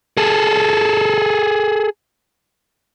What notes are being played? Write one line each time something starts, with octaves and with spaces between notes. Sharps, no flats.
G#4 A4